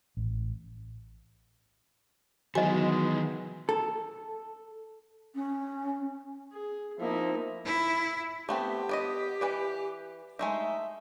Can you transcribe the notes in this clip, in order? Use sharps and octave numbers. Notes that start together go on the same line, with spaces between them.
A1
D#3 E3 F#3 G#3 B3 F#4 D#5 G#5
A4
C#4
G#4
F3 A#3 C4 D#4 E4
E4
A3 B3 C4 G4
B3 D5 D#5
E3 B4 D5
G#3 A3 D#4 E5